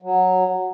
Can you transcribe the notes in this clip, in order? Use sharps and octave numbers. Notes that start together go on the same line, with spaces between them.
F#3